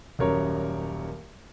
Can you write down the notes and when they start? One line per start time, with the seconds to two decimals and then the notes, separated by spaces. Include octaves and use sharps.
0.19 D#1 F#2 A#4 C#5